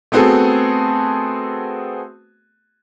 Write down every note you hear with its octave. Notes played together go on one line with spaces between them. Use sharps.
A3 B3 C4 F#4 G#4 A4